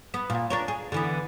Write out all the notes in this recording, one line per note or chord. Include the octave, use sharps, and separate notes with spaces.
B3
A#2
D4 A#4 C#5
G#4
D3 E3 B3